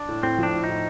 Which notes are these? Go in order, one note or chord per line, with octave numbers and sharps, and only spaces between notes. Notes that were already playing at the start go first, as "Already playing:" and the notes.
Already playing: D4
A2
A2 C4
F3 D4
A2
D#4
A2